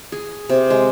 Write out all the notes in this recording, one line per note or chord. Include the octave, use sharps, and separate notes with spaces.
G#4
C3
G#3